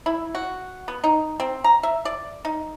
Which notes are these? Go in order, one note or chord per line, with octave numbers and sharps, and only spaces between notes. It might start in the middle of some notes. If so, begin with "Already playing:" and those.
E4
F#4
B3
D#4
C4
A#5
E5
D5
D#4